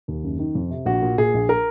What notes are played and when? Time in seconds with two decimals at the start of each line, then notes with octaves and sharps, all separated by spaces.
0.08 D#2
0.24 F#1
0.39 D#3
0.55 F2
0.70 C3
0.86 A#1 F#4
1.02 A#2
1.18 A#2 G#4
1.34 A#1
1.49 A#4